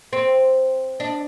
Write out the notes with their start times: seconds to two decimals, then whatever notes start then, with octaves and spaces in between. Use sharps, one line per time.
0.13 C4
1.00 D4